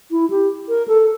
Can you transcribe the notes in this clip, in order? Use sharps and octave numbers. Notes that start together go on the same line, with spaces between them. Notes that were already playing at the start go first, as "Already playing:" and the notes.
E4
G4
A#4
A4